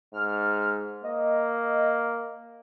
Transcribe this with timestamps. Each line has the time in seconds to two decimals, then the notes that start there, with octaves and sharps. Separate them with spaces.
0.13 G#2 F6
1.04 A#3 D#5